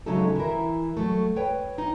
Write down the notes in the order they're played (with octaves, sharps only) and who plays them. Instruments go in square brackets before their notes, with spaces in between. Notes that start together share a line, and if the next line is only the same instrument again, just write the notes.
[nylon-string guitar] C#3 F#3 G#3 A3 D#4 A4
E3 E4 A#4
F#3 A3
B4 C#5 G5
D#4